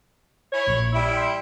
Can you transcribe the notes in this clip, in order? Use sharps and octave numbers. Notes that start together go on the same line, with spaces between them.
E4 C#5
A#1 A#2
G3 E4
G5 C6